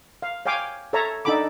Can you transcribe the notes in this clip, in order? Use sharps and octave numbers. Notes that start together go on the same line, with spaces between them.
F5
C#5 F5 G5 G#5 D6
A4 C#5 E5 A5 A#5
D4 D#4 A4 G5 B5 D6